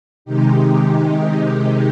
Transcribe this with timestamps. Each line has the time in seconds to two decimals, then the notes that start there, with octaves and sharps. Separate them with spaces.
0.25 C3 D#3 G#3 D#4 G4